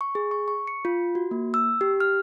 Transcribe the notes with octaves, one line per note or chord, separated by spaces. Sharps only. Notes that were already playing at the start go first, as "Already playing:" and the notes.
C#6
G#4
C#6
C#6
C#7
F4
F#4
A#3
E6
G4
F6